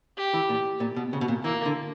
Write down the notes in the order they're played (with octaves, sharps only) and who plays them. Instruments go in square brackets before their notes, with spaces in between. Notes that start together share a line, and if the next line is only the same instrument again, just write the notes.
[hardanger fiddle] G4
[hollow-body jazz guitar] E3
A#2
A#2
B2
C#3
B2
A#2
[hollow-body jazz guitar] E3 [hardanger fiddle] A#3
[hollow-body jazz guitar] D3